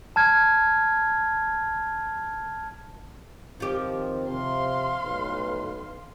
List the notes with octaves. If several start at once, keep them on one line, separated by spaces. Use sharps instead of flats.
A5 F6 G#6
D#3 F3 C4 G4
C3 F5 C6
B1 A2 B4